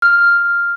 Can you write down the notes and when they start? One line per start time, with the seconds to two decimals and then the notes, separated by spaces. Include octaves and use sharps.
0.02 F6